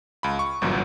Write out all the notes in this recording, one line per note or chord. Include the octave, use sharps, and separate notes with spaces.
C#2 B5
C#6
G1 C2 F#2 A#2 E3 F#3